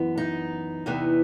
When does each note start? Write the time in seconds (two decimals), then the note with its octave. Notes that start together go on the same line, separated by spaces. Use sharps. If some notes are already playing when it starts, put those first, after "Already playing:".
Already playing: F#2 E3 B3
0.17 D#4
0.86 E2 C3 E3 B3